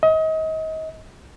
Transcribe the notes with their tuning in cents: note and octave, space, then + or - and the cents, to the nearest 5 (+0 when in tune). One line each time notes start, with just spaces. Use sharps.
D#5 +30